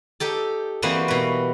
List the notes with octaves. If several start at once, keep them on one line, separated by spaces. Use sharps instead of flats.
D#4 G4 A4
E3 G3 A#3 C4 F#4 D#5
B2 B4